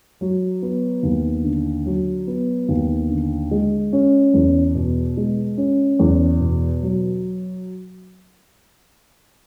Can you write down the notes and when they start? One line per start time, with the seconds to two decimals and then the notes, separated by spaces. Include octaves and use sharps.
0.21 F#3
0.62 B3
1.03 D#2
1.44 D3
1.86 F#3
2.28 B3
2.69 D#2
3.10 D3
3.51 G#3
3.93 C#4
4.34 E2
4.75 B2
5.17 G#3
5.58 C#4
5.99 E2
6.40 B2
6.83 F#3